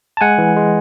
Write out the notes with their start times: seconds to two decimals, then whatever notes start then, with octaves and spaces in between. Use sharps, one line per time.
0.17 A5
0.21 G#3 F#5 G#5
0.38 E3
0.56 G#3